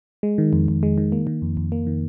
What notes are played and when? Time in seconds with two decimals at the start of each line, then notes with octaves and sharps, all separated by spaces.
0.23 G#3
0.38 D#3
0.53 F2
0.68 F2
0.83 G#3
0.98 D#3
1.12 A#3
1.27 D#3
1.42 F2
1.57 F2
1.72 A#3
1.87 D#3